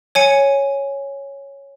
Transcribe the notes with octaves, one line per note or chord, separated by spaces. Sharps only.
C#5 G#5 C#7